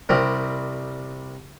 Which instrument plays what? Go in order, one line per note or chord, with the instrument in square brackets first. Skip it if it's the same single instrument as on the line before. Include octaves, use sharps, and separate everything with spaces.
[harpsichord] C2 G3 C4 A#4